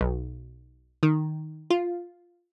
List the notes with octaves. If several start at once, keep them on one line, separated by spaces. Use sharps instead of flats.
B1
D#3
F4